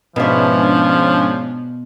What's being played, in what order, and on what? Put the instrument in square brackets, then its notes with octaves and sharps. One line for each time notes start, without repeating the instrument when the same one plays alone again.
[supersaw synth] G#2 C#4 D4 [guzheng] B2 E5 [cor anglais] F3